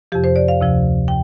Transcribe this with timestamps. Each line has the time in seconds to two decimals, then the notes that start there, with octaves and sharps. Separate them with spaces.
0.12 F2 C3 F3 G4
0.24 C5
0.36 D5
0.48 F5
0.61 D2 C3 F3
1.08 G5